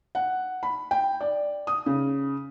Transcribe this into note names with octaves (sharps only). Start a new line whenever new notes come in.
F#5
B5
G5
D5
D#6
C#3